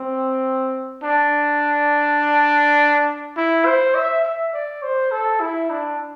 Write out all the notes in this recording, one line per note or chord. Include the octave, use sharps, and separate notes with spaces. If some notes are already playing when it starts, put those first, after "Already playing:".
Already playing: C4
D4
E4
C5
E5
E5
D5
C5
A4
E4
D4